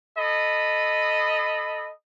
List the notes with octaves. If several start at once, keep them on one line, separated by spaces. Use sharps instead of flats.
A4 D#5 B5